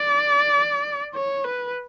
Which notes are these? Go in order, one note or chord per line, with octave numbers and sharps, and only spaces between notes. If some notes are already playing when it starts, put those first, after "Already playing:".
Already playing: D5
C#5
B4